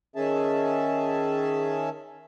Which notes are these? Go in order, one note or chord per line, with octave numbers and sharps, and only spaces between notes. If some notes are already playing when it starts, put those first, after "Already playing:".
D#3 C#4 G#4 E5 A5